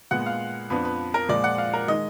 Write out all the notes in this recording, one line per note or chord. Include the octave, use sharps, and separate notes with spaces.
A#2 G#3 B3 F#5
F5
F2 F3 B3 D4 B4
B4
A#4
A#2 F3 G#3 D5
F#5
F5
A#4
D#3 G#3 D#5